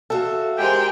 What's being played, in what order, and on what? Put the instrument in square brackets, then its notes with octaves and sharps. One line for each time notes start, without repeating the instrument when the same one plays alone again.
[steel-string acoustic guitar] F#4 E5 [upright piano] A4 F5
[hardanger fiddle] G#3 A#4 [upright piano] G4 C5 [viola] G5